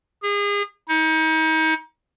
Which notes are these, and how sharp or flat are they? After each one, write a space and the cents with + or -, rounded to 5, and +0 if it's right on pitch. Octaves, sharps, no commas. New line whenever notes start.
G#4 -35
D#4 +35